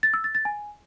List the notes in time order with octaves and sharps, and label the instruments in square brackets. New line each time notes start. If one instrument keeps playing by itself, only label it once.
[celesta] A6
E6
A6
A6
G#5